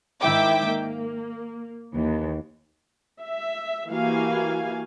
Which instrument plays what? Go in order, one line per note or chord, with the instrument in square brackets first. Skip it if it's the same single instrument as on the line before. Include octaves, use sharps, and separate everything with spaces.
[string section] G#2 D#3 E4 E5 G5 D6
A#3
D#2 E3
[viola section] E5
E3 A#3 F#4 G4 F5 G#5